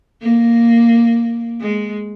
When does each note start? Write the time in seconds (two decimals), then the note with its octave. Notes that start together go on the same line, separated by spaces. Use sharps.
0.22 A#3
1.61 G#3